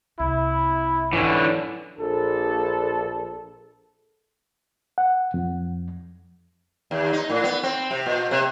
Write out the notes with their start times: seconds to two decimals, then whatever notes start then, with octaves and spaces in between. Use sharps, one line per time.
0.19 C2 E4
1.13 G#2 D3 E3 C#4
1.99 A#1 A4
4.98 F#5
5.34 F2
6.91 D#2
7.13 D#4
7.30 A2
7.44 B3
7.63 C4
7.91 C3
8.06 A#2
8.31 C3